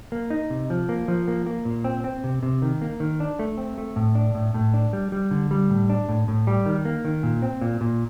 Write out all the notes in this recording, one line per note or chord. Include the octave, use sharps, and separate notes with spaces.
A#3
D#4
C3
F3
A#3
F3
A#3
A#3
A#2
C4
C4
C3
C3
D#3
A#3
D#3
D4
A3
C4
A3
A2
D4
A2
A2
D4
G3
G3
D3
G3
A2
D4
A2
A2
G3
D#3
A#3
D#3
A#2
C4
A#2
A#2